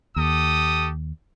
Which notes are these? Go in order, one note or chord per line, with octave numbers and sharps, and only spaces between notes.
D#2 G4 A4 D#6